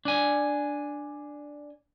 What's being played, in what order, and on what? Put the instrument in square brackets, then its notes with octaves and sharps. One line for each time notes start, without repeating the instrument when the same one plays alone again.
[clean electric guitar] D4 G#5